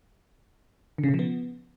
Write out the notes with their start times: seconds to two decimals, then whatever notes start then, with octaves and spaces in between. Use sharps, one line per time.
0.98 D3
1.04 C#3
1.09 B2
1.14 F3
1.19 B3